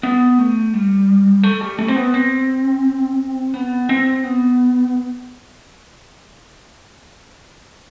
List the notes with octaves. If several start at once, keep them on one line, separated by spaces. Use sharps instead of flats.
B3
A3
G3
A3
G3
A3
C4
B3
C4
B3
C4
B3